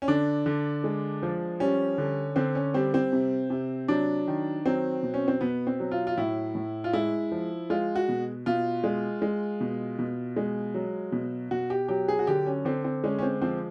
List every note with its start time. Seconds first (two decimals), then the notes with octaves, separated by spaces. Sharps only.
0.02 C#4
0.08 D3 D4
0.46 D3
0.84 G#3
1.23 F3
1.60 G3 C#4
1.98 D3
2.36 D3 C4
2.55 C#4
2.74 G3 C4
2.94 C4
3.13 C3
3.50 C3
3.88 F#3 D4
4.28 D#3
4.65 F#3 C4
5.03 B2
5.14 C#4
5.28 C4
5.41 B2 B3
5.67 C4
5.80 F#3
5.92 F4
6.07 F4
6.17 A2 E4
6.55 A2
6.84 F4
6.93 G#3 E4
7.32 F3
7.70 G#3 F4
7.96 F#4
8.08 B2
8.46 B2 F4
8.84 G#3
9.22 G#3
9.61 B2
9.99 B2
10.36 G#3
10.74 F#3
11.12 B2
11.51 B2 F#4
11.70 G4
11.88 F#3 G4
12.08 G#4
12.19 F#4
12.27 D3 G4
12.46 C#4
12.65 D3 C4
12.85 C4
13.04 G#3 C#4
13.19 C#4
13.22 C4
13.42 F3 C4